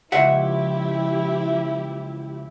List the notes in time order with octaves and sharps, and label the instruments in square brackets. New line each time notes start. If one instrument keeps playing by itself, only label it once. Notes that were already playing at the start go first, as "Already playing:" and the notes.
[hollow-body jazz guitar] C#2 E5 F#5 [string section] F3 E4 G4